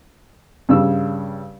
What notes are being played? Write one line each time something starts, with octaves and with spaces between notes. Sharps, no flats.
G2 C#3 E6